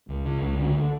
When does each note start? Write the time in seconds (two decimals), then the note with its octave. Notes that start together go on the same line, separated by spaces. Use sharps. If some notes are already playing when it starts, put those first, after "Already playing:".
0.09 C#2
0.26 C#3
0.42 C#2
0.58 D3